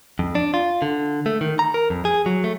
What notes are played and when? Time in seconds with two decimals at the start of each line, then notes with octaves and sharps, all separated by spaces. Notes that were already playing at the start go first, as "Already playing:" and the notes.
0.19 F2
0.35 D4
0.54 F4
0.82 D3
1.26 A3
1.41 D#3
1.59 A#5
1.74 A#4
1.90 F2
2.05 G#4
2.26 F#3
2.44 A3